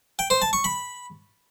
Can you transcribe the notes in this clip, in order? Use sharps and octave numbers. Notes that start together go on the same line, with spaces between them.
G5
C5
A5
C#6
B5